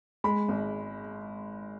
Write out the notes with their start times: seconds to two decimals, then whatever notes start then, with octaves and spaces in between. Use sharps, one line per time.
0.24 G#3 B5
0.48 G#1